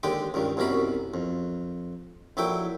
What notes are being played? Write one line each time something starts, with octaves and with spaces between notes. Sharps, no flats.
D#2 D3 G#3 G4 G5
C#2 G2 D#3
C2 F#2 B2 C#4 A#5 B5
F2
A#1 F#3 E4 A4 G5